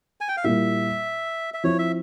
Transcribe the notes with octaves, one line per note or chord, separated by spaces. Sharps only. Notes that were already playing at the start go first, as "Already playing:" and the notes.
G#5
G5
F5
A#2 G3 A#3 E4 E5
E5
F3 C4 E4 C#5
E5